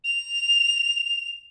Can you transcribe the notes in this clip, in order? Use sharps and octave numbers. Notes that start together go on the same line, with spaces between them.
F7